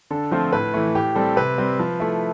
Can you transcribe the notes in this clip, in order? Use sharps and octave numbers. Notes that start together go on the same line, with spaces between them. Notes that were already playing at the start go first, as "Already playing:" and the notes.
D3 A4
F3 A3 C4 F4
A2 B4
E3 A3
A2 G4
G3 C4 A4
C3 B4
G3 C4
F3
A3 E4